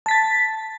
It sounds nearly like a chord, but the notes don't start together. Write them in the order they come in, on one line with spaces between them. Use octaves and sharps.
A5 B6 A6